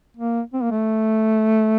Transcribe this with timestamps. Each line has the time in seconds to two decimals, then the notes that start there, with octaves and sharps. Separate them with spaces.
0.17 A#3
0.54 C4
0.63 A#3
0.71 A3